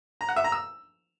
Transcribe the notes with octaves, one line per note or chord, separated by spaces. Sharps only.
A#5
F#5
E5
A#5
E6